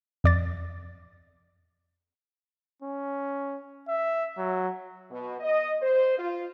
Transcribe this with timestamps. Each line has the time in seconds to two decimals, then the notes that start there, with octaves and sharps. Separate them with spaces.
0.24 F2 D5 A6
2.82 C#4
3.88 E5
4.38 F#3
5.10 B2
5.40 D#5
5.82 C5
6.18 F4